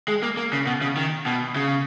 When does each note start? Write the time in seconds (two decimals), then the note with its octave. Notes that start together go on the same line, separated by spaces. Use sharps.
0.08 G#3
0.23 A#3
0.37 A#3
0.53 C#3
0.67 B2
0.82 C#3
0.97 D#3
1.26 B2
1.56 C#3